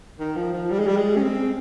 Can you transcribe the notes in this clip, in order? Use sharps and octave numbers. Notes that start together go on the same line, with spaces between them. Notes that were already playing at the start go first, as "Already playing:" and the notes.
D#3
F3
F3
G3
G#3
G3
G#3
C#4
C4